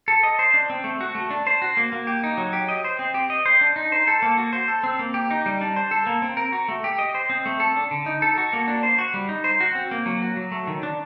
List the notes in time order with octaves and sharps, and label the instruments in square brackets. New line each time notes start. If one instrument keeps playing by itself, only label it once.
[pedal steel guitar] A4
D#5
C5
D4
C4
A3
F#4
A3
D4
C5
F#4
A#3
A#3
G4
D#4
F#3
G4
D#5
C5
C4
G4
D#5
C5
D4
D#4
C5
A4
A#3
F#4
C5
A4
C4
A#3
G4
D#4
G3
D4
C5
A4
A#3
C4
A#4
F#4
A3
G4
D#5
C5
C4
A3
A4
D4
D3
D#4
A4
F#4
A#3
D4
C5
F#4
G3
D#4
C5
F#4
C4
A#3
F#3
F#4
F#3
A3
D#3
D4